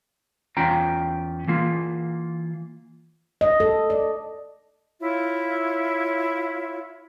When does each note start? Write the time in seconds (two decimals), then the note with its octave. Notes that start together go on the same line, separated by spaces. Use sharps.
0.57 E2 C#4 F4 G5 A#5
1.48 E3 A#3 F4
3.41 D#5
3.60 A4
3.90 D5
5.01 E4 F4 C#5 E5